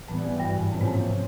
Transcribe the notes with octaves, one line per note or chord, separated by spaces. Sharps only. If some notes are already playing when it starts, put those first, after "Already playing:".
A2 E3 G3 B3
G#2
G2
G#2
A2 C3 F3 A#3 C#4
G#2
A2